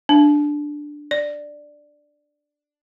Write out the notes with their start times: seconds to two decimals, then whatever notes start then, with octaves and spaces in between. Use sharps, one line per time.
0.09 D4
1.11 D5